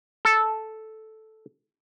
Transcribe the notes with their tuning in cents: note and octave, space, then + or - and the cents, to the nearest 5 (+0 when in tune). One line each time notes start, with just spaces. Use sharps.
A4 -5